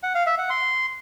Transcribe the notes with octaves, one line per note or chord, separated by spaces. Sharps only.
F#5
F5
E5
F#5
C6